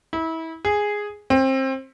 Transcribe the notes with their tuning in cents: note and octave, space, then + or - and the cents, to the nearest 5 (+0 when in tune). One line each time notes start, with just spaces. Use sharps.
E4 -30
G#4 -5
C4 +25